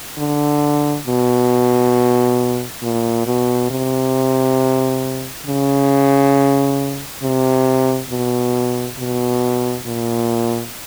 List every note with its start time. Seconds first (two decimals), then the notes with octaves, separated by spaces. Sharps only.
0.18 D3
1.07 B2
2.82 A#2
3.26 B2
3.70 C3
5.46 C#3
7.23 C3
8.09 B2
8.98 B2
9.86 A#2